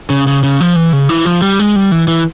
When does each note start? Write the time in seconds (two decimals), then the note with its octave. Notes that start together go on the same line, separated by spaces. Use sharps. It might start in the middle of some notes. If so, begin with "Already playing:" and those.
0.10 C#3
0.27 C#3
0.43 C#3
0.60 F3
0.76 E3
0.93 C#3
1.09 E3
1.25 F3
1.42 G3
1.59 G#3
1.76 G3
1.92 E3
2.08 E3